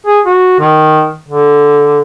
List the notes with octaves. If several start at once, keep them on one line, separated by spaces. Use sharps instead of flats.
G#4
F#4
D#3
D3